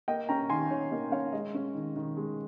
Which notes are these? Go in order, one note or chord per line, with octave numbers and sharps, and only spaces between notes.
A#3 D#5 G5
C#4 G5 A#5
D#3 G#5 C6
D#3 C#5
A#3 D#5
C#4 C#5 F5
G#3 D#5
C#4
D#3
D#3
G#3